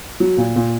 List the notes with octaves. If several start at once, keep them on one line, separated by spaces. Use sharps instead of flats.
F#3
A#2
A#2